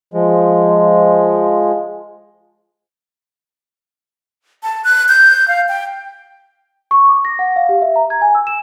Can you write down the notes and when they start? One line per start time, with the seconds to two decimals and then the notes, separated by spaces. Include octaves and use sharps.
0.14 F3 G#3
4.63 A5
4.84 F#6
5.09 G6
5.48 F5
5.69 G5
6.91 C#6
7.09 D6
7.25 A#6
7.39 F#5
7.56 F5
7.69 G4
7.82 E5
7.96 A#5
8.10 G#6
8.22 G#5
8.35 E6
8.47 E7